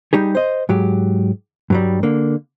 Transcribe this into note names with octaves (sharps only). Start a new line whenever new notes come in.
G3 D#4 G4 G#4
C5 D#5
G#2 F#3 G4
G2 F#3 G3
D3 A#3